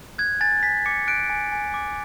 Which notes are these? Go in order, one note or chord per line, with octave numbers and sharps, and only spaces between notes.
F#6 G#6
G#5 A6
G#5 B6
D6 C#7
F#6 D7
G#5
G#5
D6